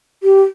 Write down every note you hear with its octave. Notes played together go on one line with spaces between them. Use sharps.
G4